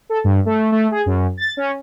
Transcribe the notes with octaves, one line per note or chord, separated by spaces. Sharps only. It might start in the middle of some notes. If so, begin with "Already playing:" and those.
A4
G2
A3
A3
G#4
F#2
A6
C#4